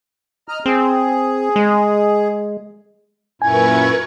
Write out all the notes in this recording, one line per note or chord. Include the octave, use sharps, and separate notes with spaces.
D#5 A#5 F6
C4 G#4
G#3
F#2 A#2 E4 A#4 B4 G#5 C#6 G#6